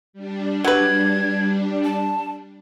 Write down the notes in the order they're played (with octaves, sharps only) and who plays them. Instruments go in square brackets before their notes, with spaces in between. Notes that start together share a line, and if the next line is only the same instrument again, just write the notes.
[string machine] G3 D4
[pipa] F#3 B4 [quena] G#6
[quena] A5